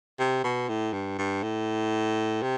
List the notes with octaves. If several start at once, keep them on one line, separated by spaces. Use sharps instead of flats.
C3
B2
A2
G2
G2
A2
C3